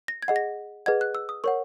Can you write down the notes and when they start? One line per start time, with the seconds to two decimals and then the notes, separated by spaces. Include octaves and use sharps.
0.08 A#6
0.22 G#6
0.28 G#4 D#5 F#5
0.36 A#6
0.86 G#4 B4 D#5 F#5 G#6
1.01 F#6
1.15 E6
1.29 D#6
1.44 A#4 C#5 F#5 C#6